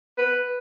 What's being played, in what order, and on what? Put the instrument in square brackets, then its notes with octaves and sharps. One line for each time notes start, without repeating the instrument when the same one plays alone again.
[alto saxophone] B4